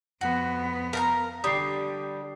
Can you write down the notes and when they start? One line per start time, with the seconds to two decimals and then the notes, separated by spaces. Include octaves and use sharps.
0.21 F2 B3 F#4
0.93 A#4 F5 A5 A#5
1.44 D3 G3 G4 D#6 C7